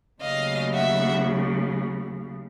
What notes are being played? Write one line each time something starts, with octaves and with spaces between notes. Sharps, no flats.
D#2 C#3 F#3 A3 D#5 F5
E5 F#5